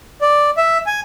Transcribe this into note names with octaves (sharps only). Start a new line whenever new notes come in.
D5
E5
G#5